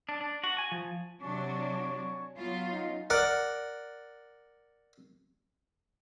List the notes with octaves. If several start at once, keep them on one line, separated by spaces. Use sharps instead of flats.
D4
D4
F#4
G#5
F3
C3 F#3 D4 C#5 G#5 C#6
F#3 B3 F4
C#4 D#4
A#4 D5 F#5